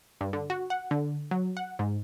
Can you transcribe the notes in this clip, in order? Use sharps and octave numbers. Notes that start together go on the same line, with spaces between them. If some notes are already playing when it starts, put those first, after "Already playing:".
G2
D3
F#4
F#5
D3
F#3
F#5
G#2